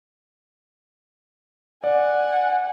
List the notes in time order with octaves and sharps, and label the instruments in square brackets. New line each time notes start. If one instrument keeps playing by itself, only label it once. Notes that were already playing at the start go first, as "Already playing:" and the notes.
[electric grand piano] D5 [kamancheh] F#5 G#5